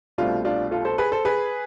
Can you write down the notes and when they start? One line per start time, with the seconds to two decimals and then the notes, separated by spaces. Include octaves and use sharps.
0.18 C2 B2 A3 C4 D4 F4
0.45 D4 F4
0.71 F4 A4
0.85 A4 C5
0.98 G#4 B4
1.12 A4 C5
1.25 G#4 B4